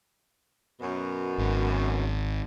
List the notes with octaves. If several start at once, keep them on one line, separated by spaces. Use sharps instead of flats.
F#2 B2
G#1